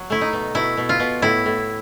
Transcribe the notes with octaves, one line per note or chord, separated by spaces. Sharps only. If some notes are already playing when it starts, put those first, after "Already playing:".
Already playing: F#3
A3 E4
D#4
B2
B2 E4
B2
F4
B2
A2 E4
A2